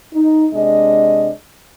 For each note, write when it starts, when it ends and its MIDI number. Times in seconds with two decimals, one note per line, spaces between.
0.13 0.46 63
0.53 1.30 48
0.53 1.30 56
0.53 1.30 62
0.53 1.30 75